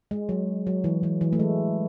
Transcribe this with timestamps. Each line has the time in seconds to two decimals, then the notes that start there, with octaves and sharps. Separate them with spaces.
0.11 G#3
0.29 F#3
0.67 F#3
0.84 E3
1.03 E3
1.21 E3
1.33 A3
1.39 G#3